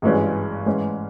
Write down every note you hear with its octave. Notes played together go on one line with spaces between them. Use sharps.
G#1 G2 E3 G#3 C#4
G#2 E3 G#3 C#4